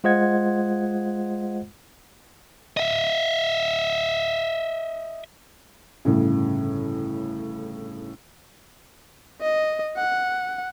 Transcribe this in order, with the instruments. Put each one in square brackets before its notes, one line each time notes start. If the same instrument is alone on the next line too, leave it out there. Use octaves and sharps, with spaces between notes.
[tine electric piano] G#3 F4 C5 D#5 F#5 G#6
[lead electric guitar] D#5 E5
[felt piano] G1 A2 C#3
[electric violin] D#5
F#5